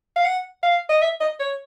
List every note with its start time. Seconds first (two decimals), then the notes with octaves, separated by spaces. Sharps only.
0.16 F5
0.25 F#5
0.63 F5
0.89 D#5
1.02 E5
1.20 D#5
1.40 C#5